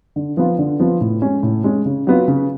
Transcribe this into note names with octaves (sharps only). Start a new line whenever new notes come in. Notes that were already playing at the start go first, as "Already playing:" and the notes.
D3
F3 B3 F4
D3
F3 B3 F4
A2
G#3 C#4
A2
G#3 C#4
C#3
F#3 B3 F4
C#3